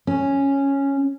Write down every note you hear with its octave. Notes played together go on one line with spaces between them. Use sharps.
C#4